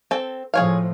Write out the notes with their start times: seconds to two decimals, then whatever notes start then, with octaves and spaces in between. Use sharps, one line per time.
0.11 C4 A4
0.54 A2 F3 G#4 C#5 F5